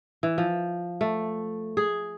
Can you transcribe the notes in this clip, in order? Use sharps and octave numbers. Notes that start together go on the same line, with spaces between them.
E3
F3
A3
G#4